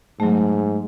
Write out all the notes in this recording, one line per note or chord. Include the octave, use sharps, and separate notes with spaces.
G#2 F#3 A3